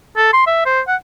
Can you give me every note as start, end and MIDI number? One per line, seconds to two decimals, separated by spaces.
0.17 0.30 69
0.33 0.46 84
0.47 0.62 76
0.66 0.80 72
0.88 0.96 78